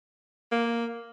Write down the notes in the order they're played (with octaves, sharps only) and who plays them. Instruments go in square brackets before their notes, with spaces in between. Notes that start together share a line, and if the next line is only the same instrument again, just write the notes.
[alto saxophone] A#3